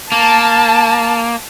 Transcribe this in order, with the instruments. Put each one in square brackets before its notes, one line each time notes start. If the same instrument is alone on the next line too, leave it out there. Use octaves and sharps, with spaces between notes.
[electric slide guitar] A#3 [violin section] A5